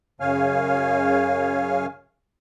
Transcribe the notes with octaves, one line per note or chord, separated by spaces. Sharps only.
F#2 C#3 C#5 F5 G#5 F6